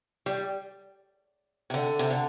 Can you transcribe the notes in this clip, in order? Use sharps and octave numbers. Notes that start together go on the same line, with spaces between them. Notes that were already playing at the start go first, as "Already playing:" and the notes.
G3
C3
D3
C3
D3